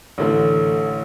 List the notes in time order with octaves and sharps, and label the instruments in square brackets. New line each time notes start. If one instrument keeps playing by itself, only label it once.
[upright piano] A1 D3 A3